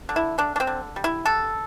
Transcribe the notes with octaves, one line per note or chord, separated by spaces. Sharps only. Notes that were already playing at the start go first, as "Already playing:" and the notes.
D3
E4
D3 D4
D4
C4
D3
G3
E4
D3 A4